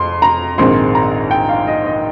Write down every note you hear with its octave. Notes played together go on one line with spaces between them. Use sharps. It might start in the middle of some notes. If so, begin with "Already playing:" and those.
Already playing: F2 C6
A#5
A#1 G#2 D#3 G#3 C4 C6
A#5
G5
F5
D#5
D#5